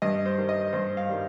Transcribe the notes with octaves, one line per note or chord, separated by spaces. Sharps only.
G2 D#5
C5
D#3 G3
D#5
G2 C5
F5
D#3 G3